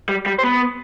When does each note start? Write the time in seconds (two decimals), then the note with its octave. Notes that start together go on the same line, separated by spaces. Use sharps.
0.09 G3
0.26 G3
0.38 C5
0.44 B3 B4